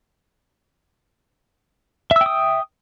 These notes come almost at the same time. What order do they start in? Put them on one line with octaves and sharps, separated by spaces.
E5 E6 G5 D#6